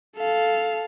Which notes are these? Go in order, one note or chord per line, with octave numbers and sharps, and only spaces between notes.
A4 F5